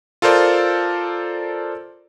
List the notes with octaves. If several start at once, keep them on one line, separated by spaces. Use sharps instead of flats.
F4 A4 A#4 C5 D5